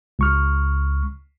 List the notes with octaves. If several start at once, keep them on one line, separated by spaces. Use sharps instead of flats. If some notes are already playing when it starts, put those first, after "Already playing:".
C#2 C#6 F6